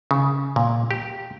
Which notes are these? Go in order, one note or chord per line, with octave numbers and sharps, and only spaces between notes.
C#3
A#2
G4